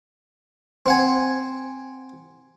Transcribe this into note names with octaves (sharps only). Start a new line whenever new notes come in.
C4 F#5 G#5